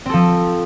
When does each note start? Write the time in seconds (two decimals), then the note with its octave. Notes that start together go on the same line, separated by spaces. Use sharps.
0.06 C4
0.10 A4
0.14 F3